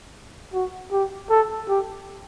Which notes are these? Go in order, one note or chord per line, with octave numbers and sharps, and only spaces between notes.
F#4
G4
A4
G4